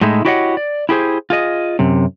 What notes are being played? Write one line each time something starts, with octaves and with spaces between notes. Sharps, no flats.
A2 G#3 D#4 E4
E4 F#4 G4 C#5 D#5 F#5
D5
E4 G4 G#4 C5
F4 G#4 D#5
F#2 C3